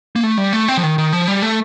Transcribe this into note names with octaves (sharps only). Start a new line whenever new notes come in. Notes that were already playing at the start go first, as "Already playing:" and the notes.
A#3
A3
G3
A3
C4
F3
D#3
D#3
F3
G3
A3